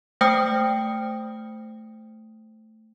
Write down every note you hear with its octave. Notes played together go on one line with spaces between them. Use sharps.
A3 C5 G5 D#6 F6 C#7